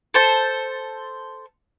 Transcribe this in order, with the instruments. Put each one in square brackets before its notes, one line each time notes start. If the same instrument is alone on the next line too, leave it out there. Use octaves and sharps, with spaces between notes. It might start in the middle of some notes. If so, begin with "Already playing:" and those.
[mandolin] A4 C5 A5